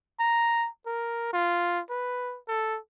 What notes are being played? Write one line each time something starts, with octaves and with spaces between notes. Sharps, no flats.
A#5
A#4
F4
B4
A4